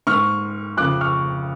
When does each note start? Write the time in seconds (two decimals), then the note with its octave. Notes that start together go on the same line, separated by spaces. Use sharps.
0.07 G#2 C#6 F6
0.77 F2 C#3 D6 F#6
1.01 C#6 F6